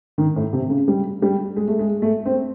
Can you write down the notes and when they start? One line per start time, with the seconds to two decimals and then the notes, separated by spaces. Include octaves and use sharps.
0.18 D#3
0.36 A2
0.53 C3
0.70 C#3
0.88 G3
1.22 G3
1.57 G#3
1.68 A3
1.79 G#3
2.02 A3
2.26 C4